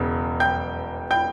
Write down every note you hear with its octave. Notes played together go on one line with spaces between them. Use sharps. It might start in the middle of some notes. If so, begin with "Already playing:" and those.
Already playing: E1 E2 C#3
G5 G6
G5 G6